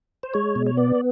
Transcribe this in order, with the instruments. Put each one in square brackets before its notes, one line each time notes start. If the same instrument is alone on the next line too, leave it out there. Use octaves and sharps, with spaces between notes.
[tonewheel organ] C5
G#3 C#5
B2
C#5
B3 D5